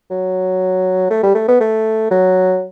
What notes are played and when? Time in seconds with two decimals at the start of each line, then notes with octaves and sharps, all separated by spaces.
0.10 F#3
1.10 A3
1.23 G3
1.35 A3
1.48 B3
1.61 A3
2.11 F#3